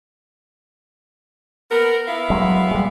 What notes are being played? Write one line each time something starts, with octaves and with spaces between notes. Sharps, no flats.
B3 A#4
B3 E4 F5
F#3 G#3
G3 G#3